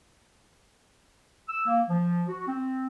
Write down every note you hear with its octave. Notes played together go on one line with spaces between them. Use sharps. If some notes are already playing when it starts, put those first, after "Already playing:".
E6
A#3
F3
F#4
C4